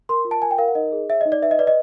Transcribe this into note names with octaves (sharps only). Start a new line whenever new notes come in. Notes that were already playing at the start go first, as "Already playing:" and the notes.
A#4 C6
F4
A5
A#4 G#5
G5
A#4 F5
F#5
D#4 D#5
G#4
C#5 E5
D#4 D#5
D5
B4 E5
D#5
B4 D5
D#5